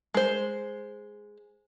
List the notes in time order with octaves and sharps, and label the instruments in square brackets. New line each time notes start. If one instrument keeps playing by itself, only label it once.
[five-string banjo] G#3 C5